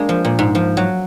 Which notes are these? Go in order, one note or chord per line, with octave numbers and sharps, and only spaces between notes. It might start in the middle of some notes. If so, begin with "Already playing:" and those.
Already playing: G#3 A#3 D4
F3
A#2
G#2
F3
F#3